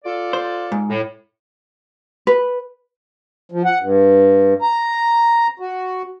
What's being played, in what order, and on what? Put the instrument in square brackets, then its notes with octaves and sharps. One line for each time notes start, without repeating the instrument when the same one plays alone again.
[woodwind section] F4 A4 D5
[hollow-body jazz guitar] C5
G#2
[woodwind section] A2
[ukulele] B4
[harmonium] F3
F#5
G2
A#5
F#4